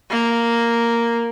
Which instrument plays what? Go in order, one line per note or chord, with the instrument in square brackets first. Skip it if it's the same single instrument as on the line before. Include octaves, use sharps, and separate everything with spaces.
[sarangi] A#3